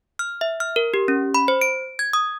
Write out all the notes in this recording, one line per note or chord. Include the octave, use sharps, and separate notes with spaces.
F6
E5
F6
A#4
G4
C#4
B5
C5
D7
G#6
D#6